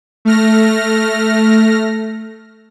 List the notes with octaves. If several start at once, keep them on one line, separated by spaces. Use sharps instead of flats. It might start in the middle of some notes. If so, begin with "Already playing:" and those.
A3 F6 A#6